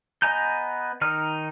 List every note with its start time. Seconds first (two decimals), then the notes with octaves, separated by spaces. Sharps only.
0.22 B3 D#5 G#5 A#5 G6
1.01 D#3 D#4 F6